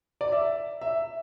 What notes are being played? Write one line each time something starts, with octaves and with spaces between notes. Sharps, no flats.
D5
E5
E5